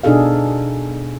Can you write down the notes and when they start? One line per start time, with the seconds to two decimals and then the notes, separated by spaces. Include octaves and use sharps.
0.04 B2 D4 D#4 G#4 A4 F5